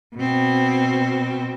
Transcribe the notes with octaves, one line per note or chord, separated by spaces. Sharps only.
B2 C4